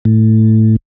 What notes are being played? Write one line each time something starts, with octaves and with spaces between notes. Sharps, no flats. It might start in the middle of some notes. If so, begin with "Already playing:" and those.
A2